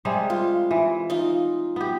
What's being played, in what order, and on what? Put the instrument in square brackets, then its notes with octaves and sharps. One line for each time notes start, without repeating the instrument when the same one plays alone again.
[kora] C3 G3 G#3
[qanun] F4
[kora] E3
[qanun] D#4 F4
[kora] B3 G4